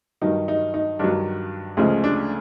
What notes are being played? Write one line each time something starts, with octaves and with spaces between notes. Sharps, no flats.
G2 D#3 F#3 D#4
D#4
D#4
G2 D#3 F#3 D4
D2 C#3 F3 G#3
D4